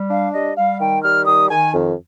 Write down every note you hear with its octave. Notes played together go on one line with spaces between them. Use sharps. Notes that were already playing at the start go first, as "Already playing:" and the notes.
Already playing: G3
D4 F5
G3 D#5
G3 F5
D#3 G5
G3 F6
D#3 D#6
D#3 G#5
F2